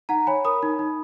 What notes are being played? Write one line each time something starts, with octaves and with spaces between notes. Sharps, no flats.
D#4 F#5 A#5
C#5 G#5 B5
A#4 B5 D#6
D#4
D#4